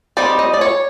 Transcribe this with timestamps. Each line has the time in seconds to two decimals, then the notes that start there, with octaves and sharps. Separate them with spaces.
0.17 G3 C4 D#4 D5
0.39 D#5
0.54 D5
0.61 C#5